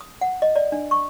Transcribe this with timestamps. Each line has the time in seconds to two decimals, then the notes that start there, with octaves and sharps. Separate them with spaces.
0.01 D#6
0.21 F#5
0.42 D#5
0.56 D5
0.72 D4
0.91 C#6